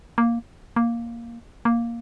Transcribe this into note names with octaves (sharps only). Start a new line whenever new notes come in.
A#3
A#3
A#3